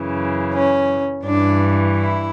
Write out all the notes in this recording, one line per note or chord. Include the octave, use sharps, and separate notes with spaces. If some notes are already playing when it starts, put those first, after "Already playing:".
Already playing: F#2 C#3 E3
C#4
G2 E3 D4
E4